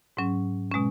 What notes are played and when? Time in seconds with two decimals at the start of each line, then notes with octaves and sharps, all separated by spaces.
0.17 G#2 F#3 C#4
0.71 B2 G#3 C#4